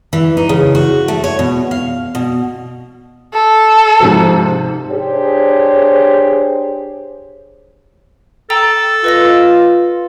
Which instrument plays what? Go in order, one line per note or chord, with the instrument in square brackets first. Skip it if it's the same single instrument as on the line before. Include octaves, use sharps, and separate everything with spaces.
[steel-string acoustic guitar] E3
D#4
C#3
F#4
A3
C#5
B2
F5
B2
[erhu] A4
[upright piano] G#2 C3 F3
[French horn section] D4 G4 G#4 C5 C#5
[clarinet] A4 [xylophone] G5 A#5 E6
[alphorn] F4 [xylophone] B4 D#5 A#6